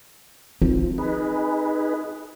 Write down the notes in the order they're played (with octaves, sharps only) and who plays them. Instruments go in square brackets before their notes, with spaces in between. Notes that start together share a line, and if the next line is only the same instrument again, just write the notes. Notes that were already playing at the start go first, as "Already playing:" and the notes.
[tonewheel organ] F3 [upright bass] C4
[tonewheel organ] D#4 G#4 B4